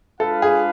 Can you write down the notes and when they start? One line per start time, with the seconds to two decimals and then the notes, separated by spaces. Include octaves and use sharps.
0.20 G#3 D4 F4 A4 B4 F5
0.42 G#4